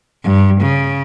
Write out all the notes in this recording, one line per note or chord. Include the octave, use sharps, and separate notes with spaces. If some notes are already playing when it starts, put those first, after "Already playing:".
G2
C#3